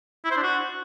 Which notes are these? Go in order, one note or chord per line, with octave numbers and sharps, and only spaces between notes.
E4
C5
D4
F#4